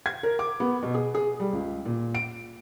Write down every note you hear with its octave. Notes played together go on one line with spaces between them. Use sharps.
G#6
A#4
D6
B3
B2
G#4
G#4
G3
C#2
A#2
D7